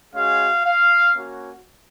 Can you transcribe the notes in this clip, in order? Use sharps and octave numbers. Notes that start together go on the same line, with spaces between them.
G#3 C#4 F#4 F5
F5
A#3 C#4 F#4